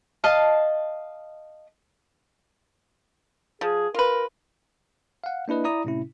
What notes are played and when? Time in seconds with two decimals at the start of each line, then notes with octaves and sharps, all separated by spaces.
0.24 D#5 F5 A5
3.61 F3 G#4
3.94 F4 A#4 B4
5.24 F5 F#5
5.48 A#3 D4 E4 B4 D#5
5.64 E4 D5 A#5 D#6
5.85 A2 C3 C#4 E4